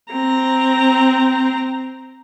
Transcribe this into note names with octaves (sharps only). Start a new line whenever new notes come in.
C4 A#5